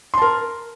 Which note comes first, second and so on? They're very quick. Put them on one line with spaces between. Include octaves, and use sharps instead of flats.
C6 A5 A#4